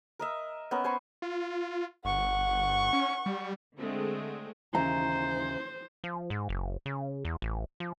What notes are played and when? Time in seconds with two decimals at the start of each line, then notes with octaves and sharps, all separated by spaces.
0.19 A#4 D#5 E5
0.71 B3 C#4 A#4
0.84 C5 G#5 B5 C#6
1.22 F4
2.05 G1 F#5 C#6
2.93 C#4
3.26 G3
3.78 D3 G#3 A3 C4
4.75 D#2 C#3 E3 C5 A#5
6.04 F3
6.30 G#2
6.49 F#1
6.86 C#3
7.25 E2
7.42 A1
7.80 F3